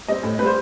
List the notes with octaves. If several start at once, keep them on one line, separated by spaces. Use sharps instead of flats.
G3 C4 D#5
A2
G3 C4 B4 C5